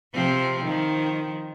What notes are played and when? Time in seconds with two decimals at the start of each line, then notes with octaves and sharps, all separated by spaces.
0.14 C3 F3 C4
0.64 D#3 F3